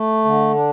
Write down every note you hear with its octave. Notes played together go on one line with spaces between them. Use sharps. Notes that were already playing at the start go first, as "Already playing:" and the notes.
Already playing: A3
D3
D4